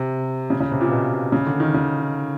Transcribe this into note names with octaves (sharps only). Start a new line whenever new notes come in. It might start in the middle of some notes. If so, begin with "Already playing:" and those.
Already playing: C3
C#3
C#3
C3
A#2
B2
C#3
D3
D#3
C#3